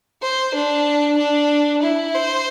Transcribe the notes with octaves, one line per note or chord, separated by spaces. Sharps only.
C5
D4
D4
E4
C5